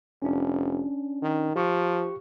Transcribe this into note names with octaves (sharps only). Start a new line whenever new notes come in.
F1 C#4 D4
D#3
F3 G4 C#6